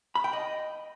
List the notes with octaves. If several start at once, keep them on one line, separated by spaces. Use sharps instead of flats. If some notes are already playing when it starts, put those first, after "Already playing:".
B5
G5
D#5